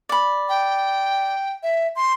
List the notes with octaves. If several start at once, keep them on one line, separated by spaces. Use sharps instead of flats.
D5 B5
G5
E5
C6